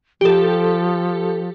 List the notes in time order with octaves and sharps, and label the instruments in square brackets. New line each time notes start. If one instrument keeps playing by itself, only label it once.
[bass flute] F3 [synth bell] G4 A4